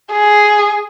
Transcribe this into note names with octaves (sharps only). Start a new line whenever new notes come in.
G#4